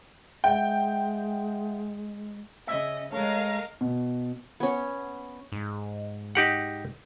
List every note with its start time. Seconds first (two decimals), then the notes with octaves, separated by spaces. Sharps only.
0.44 G#3 E5 F#5 G5
2.67 C#3 D#5 E5
3.12 G#3 A3 A#4 C#5 D#5 F5
3.81 B2
4.60 B3 C#4
5.52 G#2
6.35 D#4 G4 F#5